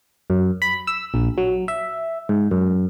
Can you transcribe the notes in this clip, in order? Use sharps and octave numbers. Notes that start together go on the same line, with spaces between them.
F#2
B5
E6
A#1
F#3
E5
G#2
F#2